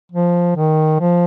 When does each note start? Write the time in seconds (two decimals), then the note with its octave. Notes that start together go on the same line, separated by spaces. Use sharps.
0.12 F3
0.56 D#3
1.00 F3